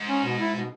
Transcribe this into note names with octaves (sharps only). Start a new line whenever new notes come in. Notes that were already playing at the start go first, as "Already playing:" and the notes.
Already playing: G#2
C#4
B2
E4
B2